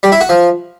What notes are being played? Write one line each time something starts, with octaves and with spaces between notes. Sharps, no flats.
G3
E4
F#4
F3